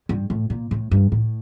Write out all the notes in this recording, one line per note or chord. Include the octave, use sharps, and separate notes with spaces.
G2
A2
A#2
A2
G2
A2